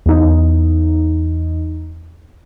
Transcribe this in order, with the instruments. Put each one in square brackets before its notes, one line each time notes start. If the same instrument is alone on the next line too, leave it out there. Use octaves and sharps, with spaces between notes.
[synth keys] E2 D#4